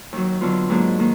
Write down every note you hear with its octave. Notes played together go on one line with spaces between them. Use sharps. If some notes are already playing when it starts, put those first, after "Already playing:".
D#2 D#3 F#3
D3 F#3 B3 F4
G#2 F#3 A#3 D4
D#3 A#3